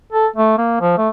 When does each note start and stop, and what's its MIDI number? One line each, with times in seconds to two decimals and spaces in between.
0.12 0.27 69
0.36 0.58 57
0.58 0.79 58
0.81 0.95 53
0.98 1.09 57